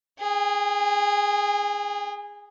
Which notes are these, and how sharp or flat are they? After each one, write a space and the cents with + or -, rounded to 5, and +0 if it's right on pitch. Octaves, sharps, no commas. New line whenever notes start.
G#4 -15 G5 +45